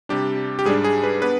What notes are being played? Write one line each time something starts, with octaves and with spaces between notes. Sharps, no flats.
C3 G3 D4 G4
G4
G#2 G3 D4 G#4
G#4
B4
B3 D4 B4